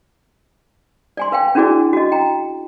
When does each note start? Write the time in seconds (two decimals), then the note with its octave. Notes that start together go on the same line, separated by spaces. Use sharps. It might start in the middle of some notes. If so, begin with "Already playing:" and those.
1.17 D5 G#5 C6
1.32 B4 F5 G5
1.55 C#4 D4 E4 F#4 G#4 D5
1.93 F#4 D#5
2.12 G5 A#5